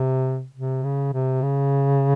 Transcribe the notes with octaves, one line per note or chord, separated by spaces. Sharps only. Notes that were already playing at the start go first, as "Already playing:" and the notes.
Already playing: C3
C3
C#3
C3
C#3